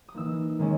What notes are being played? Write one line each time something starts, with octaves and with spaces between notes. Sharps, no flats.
D#6
E3 A#3 D#4 E6
D#3 G#3 C#4